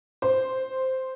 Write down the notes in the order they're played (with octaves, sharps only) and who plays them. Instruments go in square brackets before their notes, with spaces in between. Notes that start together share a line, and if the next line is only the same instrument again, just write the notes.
[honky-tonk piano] C5